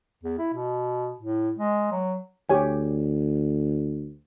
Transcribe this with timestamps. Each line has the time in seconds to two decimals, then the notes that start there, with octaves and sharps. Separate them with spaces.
0.23 E2
0.38 E4
0.54 B2
1.19 A2
1.59 G#3
1.92 F#3
2.49 D2 G4 C#5 G#5